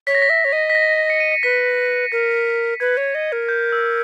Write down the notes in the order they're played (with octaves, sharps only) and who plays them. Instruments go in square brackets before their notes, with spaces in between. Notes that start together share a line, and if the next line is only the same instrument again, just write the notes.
[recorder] C#5 [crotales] B6
[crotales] A#6
B6
[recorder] E5
C#5
D#5
[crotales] B6
A#6
C#7
D#7
C#7
[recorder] B4 [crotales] B6
[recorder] A#4 [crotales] A#6
[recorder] B4 [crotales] G#6
[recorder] C#5
D#5
A#4
[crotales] G6
E6